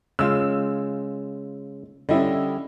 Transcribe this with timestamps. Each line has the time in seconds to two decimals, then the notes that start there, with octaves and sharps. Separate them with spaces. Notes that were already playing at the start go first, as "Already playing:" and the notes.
0.19 C#3 G#3 F4 E6
2.09 D3 G3 C#4 E4 D#5